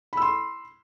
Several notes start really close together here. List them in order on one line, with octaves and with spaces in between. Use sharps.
B5 E6 C6